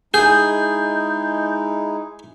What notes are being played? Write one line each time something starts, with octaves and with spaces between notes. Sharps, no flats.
G#3 D#4 E4 G#4 G6